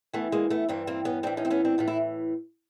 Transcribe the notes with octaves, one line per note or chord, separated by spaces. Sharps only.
G2 E3 A3 B3
G#3 A#3
A3 B3
G2 E3 A#3 C4
A#3 C4
B3 C#4
A2 E3 C4 D4
C#4 D#4
C4
B3 C#4
C4 D4
A2 E3 F4
E4